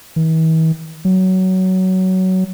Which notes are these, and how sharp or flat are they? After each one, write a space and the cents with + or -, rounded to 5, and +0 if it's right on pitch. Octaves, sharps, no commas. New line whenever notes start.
E3 -45
F#3 +15